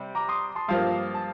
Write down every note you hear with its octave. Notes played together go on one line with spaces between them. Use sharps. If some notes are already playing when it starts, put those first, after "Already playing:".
Already playing: C3 G3
A#5 D6
C6 D#6
A5 C6
G2 F3 A#3 F5 A5
A5